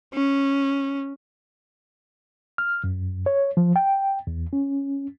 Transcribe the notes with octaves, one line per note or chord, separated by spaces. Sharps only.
C#4
F6
F#2
C#5
F3
G5
E2
C#4